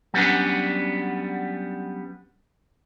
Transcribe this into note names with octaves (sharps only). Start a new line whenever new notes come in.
F#3 G3 B3 C#4 D4